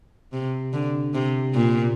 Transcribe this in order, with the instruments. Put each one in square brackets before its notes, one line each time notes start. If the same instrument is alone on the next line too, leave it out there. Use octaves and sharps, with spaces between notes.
[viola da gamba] C3
D3
C3
A#2